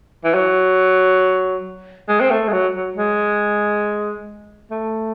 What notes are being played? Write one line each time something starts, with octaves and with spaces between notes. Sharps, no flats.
E3
F#3
G#3
C4
A3
G#3
F#3
F#3
G#3
A3